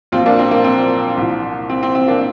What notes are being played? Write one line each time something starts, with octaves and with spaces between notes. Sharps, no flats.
A#1 A#2 F3 C4 F4
A#3 D4
C4
A#3
C4
C2 A#2 F3
C4
C4
C4
A#3 D4